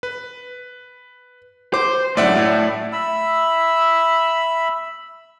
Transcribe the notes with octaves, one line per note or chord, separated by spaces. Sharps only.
B4
C5 D6
F#2 A2 D5 E5 F#5
A2
E5 B5 E6